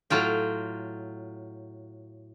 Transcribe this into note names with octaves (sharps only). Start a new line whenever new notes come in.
A2 F#3 F4 G5